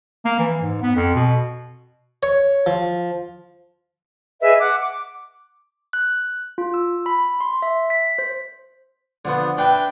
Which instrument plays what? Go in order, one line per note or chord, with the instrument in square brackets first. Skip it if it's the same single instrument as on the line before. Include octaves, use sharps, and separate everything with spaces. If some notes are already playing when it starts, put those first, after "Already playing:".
[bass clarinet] A#3
E3
G#2
B3
F2
B2
[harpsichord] C#5
F3
[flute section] G#4 B4 D#5 E5
F#5 D6 F#6
D6
[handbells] F#6
F4
E6
B5
C6
E5
B6
C5
[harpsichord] D3 F3 B3
[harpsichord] D4 B4 E5 [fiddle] G5